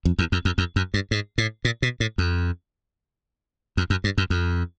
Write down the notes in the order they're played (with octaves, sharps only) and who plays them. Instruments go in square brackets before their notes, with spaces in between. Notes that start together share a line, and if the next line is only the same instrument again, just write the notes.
[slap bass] F2
E2
F2
F2
F2
F#2
G2
G#2
A2
A#2
B2
A2
F2
F2
F#2
G2
F#2
F2